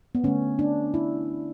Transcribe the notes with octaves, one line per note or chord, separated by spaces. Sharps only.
B3
D3 A3 C#4
D4
E4